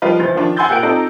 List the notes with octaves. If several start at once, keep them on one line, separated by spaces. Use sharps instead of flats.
F3 G3 F4 A#4 B4 D#5
C#2 E3 C5 A6
D#3 F3 D4 F4
F#5 G#5 C6 E6 G6 A6
A#2 G4 A#4 F5 F#5 D7
C4 D#4 F4 A4 D5 A#5